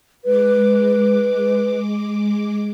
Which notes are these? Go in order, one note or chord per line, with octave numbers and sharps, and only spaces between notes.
G#3 B4 D6